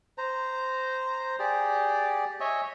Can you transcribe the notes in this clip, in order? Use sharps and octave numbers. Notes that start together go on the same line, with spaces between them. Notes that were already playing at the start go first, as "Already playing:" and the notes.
C5 A#5
G4 G#4 D5
C#5 D#5 E5 G#5